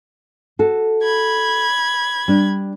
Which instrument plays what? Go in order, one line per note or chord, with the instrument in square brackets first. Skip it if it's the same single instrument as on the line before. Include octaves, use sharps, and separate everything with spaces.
[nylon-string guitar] F#4 A4
[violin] B5 G#6
[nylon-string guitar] G3 D4